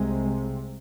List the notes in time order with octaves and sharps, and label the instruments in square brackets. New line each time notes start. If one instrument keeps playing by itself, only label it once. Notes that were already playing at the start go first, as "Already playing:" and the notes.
Already playing: [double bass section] C2 C3 G#3